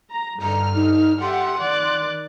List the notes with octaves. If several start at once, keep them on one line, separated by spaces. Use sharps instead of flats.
A#5
G2 D3 A#5 F6
D#4
G4 E5 F#5 C6
D#3 D5 F#6